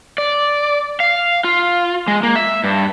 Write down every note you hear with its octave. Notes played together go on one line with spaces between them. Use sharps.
D5
F5
F4
G#3
A#3
E5
G2